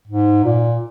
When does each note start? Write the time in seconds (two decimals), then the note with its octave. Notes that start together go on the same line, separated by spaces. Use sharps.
0.07 G#2
0.44 A#2